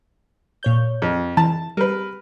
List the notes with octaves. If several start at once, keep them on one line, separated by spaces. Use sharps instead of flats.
A#2 C#5 G6
F2
E3 A5
G3 A#4 B4